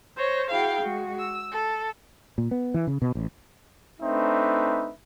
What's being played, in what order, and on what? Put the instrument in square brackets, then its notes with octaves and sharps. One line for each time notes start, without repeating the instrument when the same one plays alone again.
[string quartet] C5 C#5 A#6
E4 F#4 G#4 F5 G5
G#3 F#4
E6
A4
[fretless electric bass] A#2
B3
E3
C#3
B2
A1
[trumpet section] A3 C4 D4 D#4 B4 E5